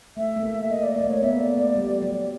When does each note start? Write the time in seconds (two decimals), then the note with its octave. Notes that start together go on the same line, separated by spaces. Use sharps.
0.17 A3 E5
0.36 A3
0.43 A#3
0.70 A#3 D#5
0.83 D5
0.96 A#3 D5
1.04 A3
1.10 A#3 C#5
1.22 B3 E5
1.40 B3 D5
1.57 A3 D5
1.76 G3
2.02 F#3